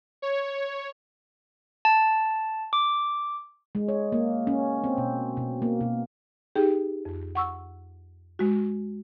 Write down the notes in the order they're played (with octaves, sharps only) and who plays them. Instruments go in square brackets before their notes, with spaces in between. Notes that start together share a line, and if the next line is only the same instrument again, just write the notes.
[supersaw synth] C#5
[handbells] A5
D6
[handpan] G#3
C#5
A#3
C#4
C4
B2
B2
A#3
B2
[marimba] D#4 G4 G#4 G5
F2
F#5 C#6 E6
G#3 F#4